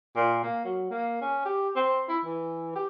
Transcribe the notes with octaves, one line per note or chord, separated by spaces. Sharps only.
A#2
A#3
F#3
A#3
C#4
G4
C4
E4
E3
G4